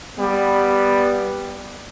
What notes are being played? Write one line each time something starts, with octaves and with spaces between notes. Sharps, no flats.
G3 B3